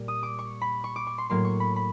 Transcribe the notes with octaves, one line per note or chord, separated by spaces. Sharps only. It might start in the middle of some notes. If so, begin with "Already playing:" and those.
Already playing: A#2 G3 A#3
D#6
D6
C#6
B5
C#6
D6
C#6
C6
A2 F#3 A#3 C6
C#6
B5
B5